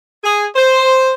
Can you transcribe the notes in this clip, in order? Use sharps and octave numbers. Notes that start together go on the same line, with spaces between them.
G#4
C5